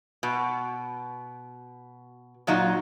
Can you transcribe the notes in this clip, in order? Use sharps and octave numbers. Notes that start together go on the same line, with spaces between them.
B2
A#2 F#3 D#4 F4